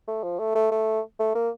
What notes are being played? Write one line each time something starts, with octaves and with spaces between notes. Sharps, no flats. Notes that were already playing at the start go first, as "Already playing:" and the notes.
A3
F3
A3
A3
A3
A3
A#3